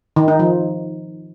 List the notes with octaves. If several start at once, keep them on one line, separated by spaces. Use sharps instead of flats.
D#3
D#4
F3